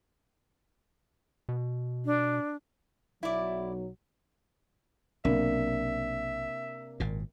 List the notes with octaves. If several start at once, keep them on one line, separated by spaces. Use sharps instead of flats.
B2
D4
B1 F#3 E4 D5
B1 C3 A#3 D4 E5
G#1 A#2